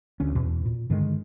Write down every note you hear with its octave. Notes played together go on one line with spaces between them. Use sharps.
D2 D3 C#4
E2 B2
A#2
G2 D3 D#3 G#3